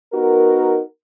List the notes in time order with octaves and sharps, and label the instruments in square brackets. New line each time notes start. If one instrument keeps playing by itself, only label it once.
[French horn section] B3 D#4 F#4 A#4